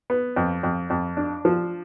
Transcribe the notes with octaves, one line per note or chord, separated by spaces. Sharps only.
B3
F2
F2
F2
D4
F3